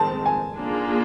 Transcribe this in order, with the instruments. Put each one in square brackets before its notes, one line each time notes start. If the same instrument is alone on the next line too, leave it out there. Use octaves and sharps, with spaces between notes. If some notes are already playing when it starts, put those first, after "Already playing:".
Already playing: [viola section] D#3 G#3 C4 [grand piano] A5
[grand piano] G#5
[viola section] A#3 D4 F4 G#4